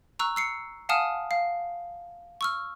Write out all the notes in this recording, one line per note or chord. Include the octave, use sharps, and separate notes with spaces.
A#5 C#6 E6 F#6
E6 C7 C#7
F5 F#5 G#5 A5 D#6 F6
F5
C#6 E6 F6